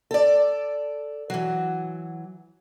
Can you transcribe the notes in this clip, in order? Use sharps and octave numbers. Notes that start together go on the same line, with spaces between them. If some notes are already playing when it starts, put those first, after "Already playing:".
A4 D5
E3 F#3